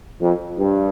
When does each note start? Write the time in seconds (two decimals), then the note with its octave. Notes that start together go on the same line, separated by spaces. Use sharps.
0.21 F2
0.58 G2